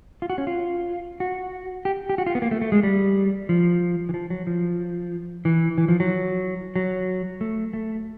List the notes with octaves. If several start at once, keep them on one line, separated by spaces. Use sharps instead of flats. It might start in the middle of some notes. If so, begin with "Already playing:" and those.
F4
F#4
C#4
F4
F#4
G4
G4
F#4
F4
B3
A#3
A3
A3
G#3
G3
F3
E3
F3
F#3
F3
E3
E3
F3
F#3
F#3
A3
A3